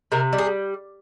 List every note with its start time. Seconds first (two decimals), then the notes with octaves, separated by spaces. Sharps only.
0.12 C3 A#4
0.33 G3
0.38 G#4